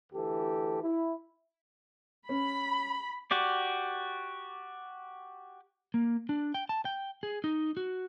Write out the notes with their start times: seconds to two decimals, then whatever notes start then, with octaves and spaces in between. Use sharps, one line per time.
0.13 D2 E3 G4 A4
0.82 E4
2.29 C#4 B5
3.31 F#4 G4 D5
5.94 A#3
6.29 D4
6.54 G5
6.69 A5
6.85 G5
7.23 G#4
7.44 D#4
7.77 F#4